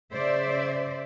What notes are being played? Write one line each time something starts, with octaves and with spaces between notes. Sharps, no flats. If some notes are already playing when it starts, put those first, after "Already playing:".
C#3 C5 D5 E5